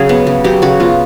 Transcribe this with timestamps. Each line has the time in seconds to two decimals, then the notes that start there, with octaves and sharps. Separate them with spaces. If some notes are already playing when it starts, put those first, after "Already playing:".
Already playing: C#3 F#3 G#4
0.09 B3
0.27 C#3
0.44 F#3 G4
0.62 C#3 F#4
0.80 B3 F4